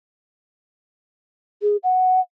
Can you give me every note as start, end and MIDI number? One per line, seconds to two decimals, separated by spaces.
1.62 1.77 68
1.84 2.20 78